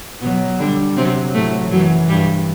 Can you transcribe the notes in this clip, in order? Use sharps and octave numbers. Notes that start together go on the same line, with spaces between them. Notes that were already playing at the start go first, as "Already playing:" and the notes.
B2 F#3 B3
D3 G3 D4
C3 F#3 C4
A2 A3
F#2 E3 F#3
G2 G3